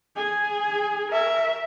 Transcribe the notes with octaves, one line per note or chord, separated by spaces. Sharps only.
G#4 G#5
A#4 E5